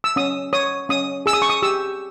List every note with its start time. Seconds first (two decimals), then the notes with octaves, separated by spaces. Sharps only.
0.04 E6
0.16 C#4 D#6
0.53 C#5 D#6
0.89 C#4 D#6
1.26 G#4 E6
1.33 D#6
1.42 C#6
1.50 D#6
1.62 G4 E6